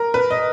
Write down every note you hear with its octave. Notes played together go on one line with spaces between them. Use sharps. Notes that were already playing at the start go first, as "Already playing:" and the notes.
Already playing: A#4
B4
D#5